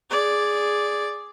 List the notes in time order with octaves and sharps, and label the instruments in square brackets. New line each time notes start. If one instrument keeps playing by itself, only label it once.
[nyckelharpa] G#4 D5